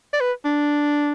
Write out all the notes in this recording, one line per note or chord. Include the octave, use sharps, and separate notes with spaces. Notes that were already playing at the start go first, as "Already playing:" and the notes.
D5
B4
D4